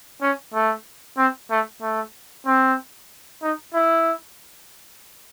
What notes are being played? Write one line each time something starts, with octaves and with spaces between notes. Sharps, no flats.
C#4
A3
C4
A3
A3
C4
D#4
E4